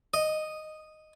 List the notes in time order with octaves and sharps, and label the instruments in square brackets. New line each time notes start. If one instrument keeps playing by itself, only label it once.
[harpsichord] D#5